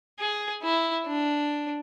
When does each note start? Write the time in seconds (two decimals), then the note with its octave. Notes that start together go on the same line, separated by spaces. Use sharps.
0.19 G#4
0.63 E4
1.07 D4